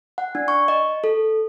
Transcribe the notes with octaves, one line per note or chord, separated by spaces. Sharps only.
F#5
D4
C#6
D#5
A4